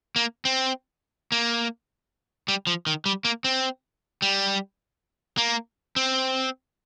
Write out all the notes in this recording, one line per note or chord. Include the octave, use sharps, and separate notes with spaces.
A#3
C4
A#3
G3
F3
D#3
G3
A#3
C4
G3
A#3
C4